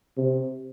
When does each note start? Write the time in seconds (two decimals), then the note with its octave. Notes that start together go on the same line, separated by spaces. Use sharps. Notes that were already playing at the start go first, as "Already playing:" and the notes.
0.17 C3